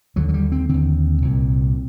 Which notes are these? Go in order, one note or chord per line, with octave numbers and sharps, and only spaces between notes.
D#2 D3 F#3
F#3
G3
C4
D#2 D3 C4
C2 A#2